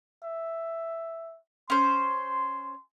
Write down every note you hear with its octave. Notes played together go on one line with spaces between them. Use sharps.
E5
C#4 C5 C6